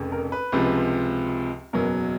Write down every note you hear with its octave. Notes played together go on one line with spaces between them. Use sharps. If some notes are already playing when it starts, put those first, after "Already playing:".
Already playing: F1 F2 C#3
A#4
B4
C#2 C3 F3 G#3
F#1 E2 B2 F#3 A#4